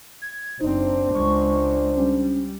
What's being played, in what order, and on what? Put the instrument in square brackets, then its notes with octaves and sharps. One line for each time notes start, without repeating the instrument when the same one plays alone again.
[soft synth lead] G#6
[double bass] F#1 C4 [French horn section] D4 C5 [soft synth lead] D#4
[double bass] C#2 G#3 [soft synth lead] C#6
[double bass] G3 [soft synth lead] C#4